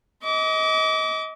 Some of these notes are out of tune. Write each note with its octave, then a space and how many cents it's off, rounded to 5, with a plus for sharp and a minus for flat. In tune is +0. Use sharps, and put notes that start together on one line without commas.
D#5 +30 D6 -30